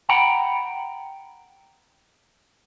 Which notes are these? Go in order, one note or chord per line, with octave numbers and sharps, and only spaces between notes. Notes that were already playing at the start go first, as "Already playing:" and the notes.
F#5 G5 A#5 B5